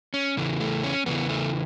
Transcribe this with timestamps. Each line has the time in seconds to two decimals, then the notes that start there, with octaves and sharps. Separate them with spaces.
0.14 C#4
0.37 E2 C#3 E3
0.60 A3
0.83 C#4
1.06 E2 C#3 E3 B3
1.29 A3